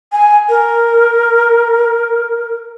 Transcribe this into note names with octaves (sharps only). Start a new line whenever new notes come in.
G#5
A#4